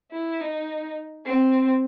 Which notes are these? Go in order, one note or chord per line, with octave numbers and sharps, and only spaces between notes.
E4
D#4
C4